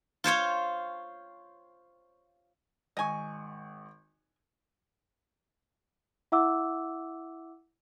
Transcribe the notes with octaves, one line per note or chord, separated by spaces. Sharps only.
F4 C5 C#5 F5
G#1 D#5 G#5 C#6
E4 E5 F#5 D6 E6